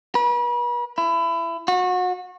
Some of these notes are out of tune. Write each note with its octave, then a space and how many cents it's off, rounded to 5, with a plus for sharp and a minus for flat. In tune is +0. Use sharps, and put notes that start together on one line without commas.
B4 -40
E4 +25
F#4 -30